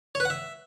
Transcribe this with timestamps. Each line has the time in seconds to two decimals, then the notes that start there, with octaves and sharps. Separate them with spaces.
0.15 C#5
0.20 B4
0.25 F#5
0.30 E5